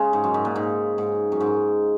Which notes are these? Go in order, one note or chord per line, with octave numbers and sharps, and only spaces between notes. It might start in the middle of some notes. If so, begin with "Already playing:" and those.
Already playing: C#3 G#3
G#2
F#2
G#2
A#2
G#2
G#2
F#2
G#2